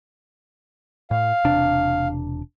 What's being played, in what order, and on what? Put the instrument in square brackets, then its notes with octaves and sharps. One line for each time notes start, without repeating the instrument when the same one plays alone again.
[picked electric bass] A2 [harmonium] F5
[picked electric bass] E1 C3 D4